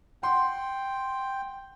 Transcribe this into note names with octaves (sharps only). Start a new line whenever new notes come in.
F#5 G5 C6